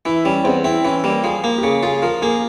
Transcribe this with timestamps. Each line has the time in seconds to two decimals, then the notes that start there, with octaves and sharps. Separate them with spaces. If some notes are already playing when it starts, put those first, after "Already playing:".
0.05 E3 E4
0.25 G3 C#4
0.44 E2 C4
0.64 C4 E4
0.85 E3 C#4
1.04 G3 A#3
1.24 F3 G#4
1.44 A#3
1.58 G4
1.63 C#3 G#4
1.83 F4 G#4
2.02 F3 A#4
2.22 A#3 G#4